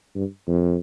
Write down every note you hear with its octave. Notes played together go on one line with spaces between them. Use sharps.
G2
F2